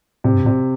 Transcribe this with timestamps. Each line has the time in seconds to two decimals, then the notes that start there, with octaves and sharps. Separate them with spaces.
0.24 A2 C3
0.34 G2
0.45 A2 C3